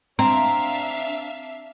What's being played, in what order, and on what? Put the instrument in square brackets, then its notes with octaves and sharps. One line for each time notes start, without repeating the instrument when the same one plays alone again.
[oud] C4 [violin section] D4 E5 F5 [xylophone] A#5